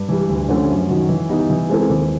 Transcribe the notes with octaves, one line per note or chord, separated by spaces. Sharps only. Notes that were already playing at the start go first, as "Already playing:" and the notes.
Already playing: G2
E3 G3
D2
D3 F3 A3 C#4
F#2
D#3 F#3
E3
G3 B3 D#4
E3
G#3 C4 E4 A4
D#2